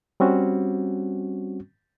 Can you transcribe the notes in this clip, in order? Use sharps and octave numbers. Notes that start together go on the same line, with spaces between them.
G3 C4 C#4 F#4